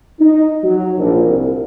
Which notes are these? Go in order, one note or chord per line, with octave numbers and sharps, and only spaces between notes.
D#4
F#3
A#1
C2